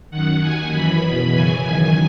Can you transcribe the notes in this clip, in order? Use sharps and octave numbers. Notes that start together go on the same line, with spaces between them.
F#2 D#3 F#5
D#2 D#3 G#5
F#2 E3 B5
E2 B2
F#2 C#3 E3 G#5
F#2 D#3